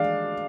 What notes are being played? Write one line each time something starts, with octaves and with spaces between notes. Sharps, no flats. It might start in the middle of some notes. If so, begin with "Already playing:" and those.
Already playing: G#3 D4 F5